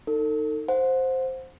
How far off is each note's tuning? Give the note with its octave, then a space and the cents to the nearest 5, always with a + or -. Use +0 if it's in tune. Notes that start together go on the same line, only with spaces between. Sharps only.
D#4 +0 A4 +40
C5 +0 F#5 -35